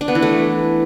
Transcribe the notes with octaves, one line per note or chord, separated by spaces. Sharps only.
D4
B3
E3
A3